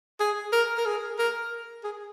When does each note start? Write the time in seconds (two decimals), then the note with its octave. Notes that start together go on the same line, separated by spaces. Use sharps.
0.20 G#4
0.53 A#4
0.78 A#4
0.86 G#4
1.19 A#4
1.84 G#4